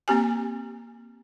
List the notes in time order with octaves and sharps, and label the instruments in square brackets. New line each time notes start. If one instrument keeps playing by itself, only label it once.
[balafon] A#3 C4 G4 G#5